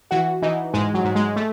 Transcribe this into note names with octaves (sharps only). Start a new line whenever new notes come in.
E3 F#4
E3 D#4
G#2 G#3
F#3
G#2
G#3
A3